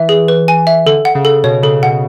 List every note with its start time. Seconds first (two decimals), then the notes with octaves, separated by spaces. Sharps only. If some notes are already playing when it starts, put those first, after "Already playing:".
Already playing: E3 E5
0.09 G#4
0.28 B4
0.48 G#5
0.67 E5
0.86 D3 A4
1.05 F#5
1.15 C#3
1.25 A4
1.44 B2 C#5
1.63 C#3 A4
1.83 B2 F#5